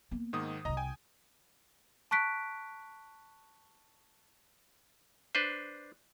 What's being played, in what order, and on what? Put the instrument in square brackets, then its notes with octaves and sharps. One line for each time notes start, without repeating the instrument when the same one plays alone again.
[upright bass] A#3 B3
[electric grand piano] G#2 D#3 D#6
[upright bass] C2 D3 [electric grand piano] D#5 A#5
[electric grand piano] G5 G#5
[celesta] A5 C#6 F#6 B6 D7
[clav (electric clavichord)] D4 B4 C5